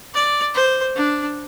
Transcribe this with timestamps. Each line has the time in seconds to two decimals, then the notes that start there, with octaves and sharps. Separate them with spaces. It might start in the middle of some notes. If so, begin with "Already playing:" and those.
0.14 D5
0.54 C5
0.95 D4